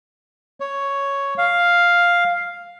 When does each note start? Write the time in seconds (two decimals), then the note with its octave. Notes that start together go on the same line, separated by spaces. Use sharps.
0.60 C#5
1.38 F5